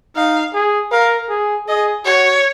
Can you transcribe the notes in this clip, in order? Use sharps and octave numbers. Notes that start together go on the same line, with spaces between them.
D#4 F5
G#4
A#4 F5
G#4
G#4 D#5
F#4 C#5